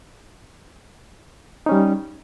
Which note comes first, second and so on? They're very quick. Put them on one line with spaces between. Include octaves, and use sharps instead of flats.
D#4 C#4 G3